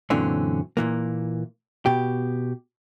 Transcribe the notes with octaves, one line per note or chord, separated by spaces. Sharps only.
F#2 A#2 D3 E3 C4 C#4
A#2 E3 A#3
B2 G4